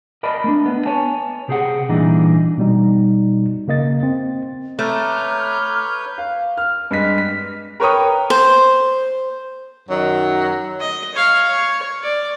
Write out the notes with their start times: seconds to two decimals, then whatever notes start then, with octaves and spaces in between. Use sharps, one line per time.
0.23 A#4 D5 D#5 A5 B5
0.44 A3 C#4 D4
0.66 B3
0.86 C#5 G#5 A5
1.48 C3 G4 G#4 C5 F#5
1.89 A#2 E3 G3 D4 D#4
2.58 B2 G3 D#4
3.68 C#3 A#3 D#5 A6
4.03 C4
4.79 A3 B4 C#5 A#5 D6 F6 G6
6.18 F5
6.57 F6
6.91 G2 G#3 B6
7.18 B6
7.80 A#4 B4 C#5 G5 C#6 D#6
8.30 C5
9.88 F#2 D#3 F#3
10.80 D#5
11.14 C#5 F5
11.50 C#5
12.03 D5